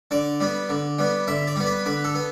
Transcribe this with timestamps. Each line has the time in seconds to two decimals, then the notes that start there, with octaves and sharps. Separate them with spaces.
0.11 D3 D5
0.40 G3 B3
0.70 D3
0.98 G3 B3
1.28 D3 E5
1.47 D5
1.56 G3 B3
1.66 B4
1.85 D3 B4
2.04 A4
2.15 B3